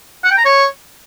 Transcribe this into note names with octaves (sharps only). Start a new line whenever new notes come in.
F#5
G5
A#5
C#5